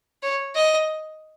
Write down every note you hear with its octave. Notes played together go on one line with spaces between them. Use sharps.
C#5
D#5